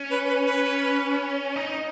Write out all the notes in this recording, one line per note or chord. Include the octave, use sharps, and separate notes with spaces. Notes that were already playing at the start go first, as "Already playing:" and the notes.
Already playing: C#4
B4
B4
B4
D#4